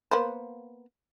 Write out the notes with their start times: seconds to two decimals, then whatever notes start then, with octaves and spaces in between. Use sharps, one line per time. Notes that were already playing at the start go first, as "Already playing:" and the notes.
0.11 A#3 B3 C5